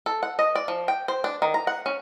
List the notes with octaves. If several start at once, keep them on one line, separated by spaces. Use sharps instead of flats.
A4
F#5
D#5
D5
F3
G5
C5
D4
D#3
A#5
F#5
C#4